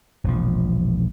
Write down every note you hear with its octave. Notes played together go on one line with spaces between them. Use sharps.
E1 A#1 F3